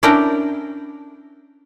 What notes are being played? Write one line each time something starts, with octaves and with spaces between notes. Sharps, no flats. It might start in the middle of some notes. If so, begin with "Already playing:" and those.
C#4 D4 E4 A#4 G5 A#5